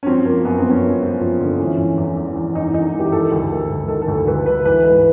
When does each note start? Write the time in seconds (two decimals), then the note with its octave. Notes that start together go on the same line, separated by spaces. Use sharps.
0.03 C#4
0.06 F3 C4
0.26 F3 A#3
0.45 F#2 B3
0.58 C4
0.64 F3
0.70 C#4
0.83 F#2
1.02 F3
1.21 F3
1.41 D3
1.59 E3 C#4
1.78 E3
1.98 E2
2.17 E2
2.36 E2
2.55 E2 D#4
2.74 E2 D#4
2.93 E3
3.00 G4
3.12 D#3 A4
3.32 D2
3.50 D#3
3.70 D2
3.88 D#3 A4
4.02 A4
4.08 D2
4.27 D2 B4
4.46 D2 B4
4.65 E3 B4
4.84 G#2 B4